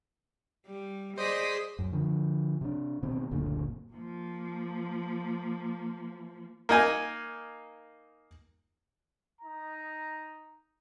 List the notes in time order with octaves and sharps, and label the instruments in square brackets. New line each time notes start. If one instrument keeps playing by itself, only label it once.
[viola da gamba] G3
[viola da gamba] G#4 D5 D#5 [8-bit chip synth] C5 D#6 B6
[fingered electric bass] F#2
D3 F3
C3 D4
B2 D#3 C4
F#1 D2 A#2 D3
[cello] F3 A#3
[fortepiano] A#3 D#4 G#5
[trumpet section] D#4 A#5